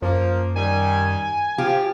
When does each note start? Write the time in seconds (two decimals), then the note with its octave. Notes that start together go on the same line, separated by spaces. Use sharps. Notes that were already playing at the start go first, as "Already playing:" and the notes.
0.02 F#2 F3 A#3
0.56 D#3 G3 G#5
1.58 F3 F4 G4